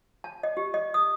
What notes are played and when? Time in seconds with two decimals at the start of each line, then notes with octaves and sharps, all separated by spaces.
0.24 A5
0.43 D#5
0.57 G4
0.74 D#5
0.94 D#6